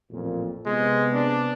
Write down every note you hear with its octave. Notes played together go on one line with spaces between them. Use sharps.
A1 F2 A#2
C3 G#3 B3
D4